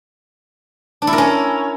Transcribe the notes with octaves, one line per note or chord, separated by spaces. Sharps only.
D4
E4
A#4
C#4